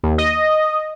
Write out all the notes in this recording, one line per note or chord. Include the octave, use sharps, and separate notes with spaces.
D#2
D#5